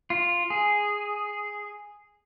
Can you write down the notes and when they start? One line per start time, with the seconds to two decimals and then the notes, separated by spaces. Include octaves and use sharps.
0.10 F4
0.50 G#4